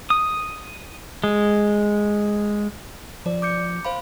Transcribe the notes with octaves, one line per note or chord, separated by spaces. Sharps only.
D#6
G#3
F3 D5
D6 G6 C#7
C5 F5 B5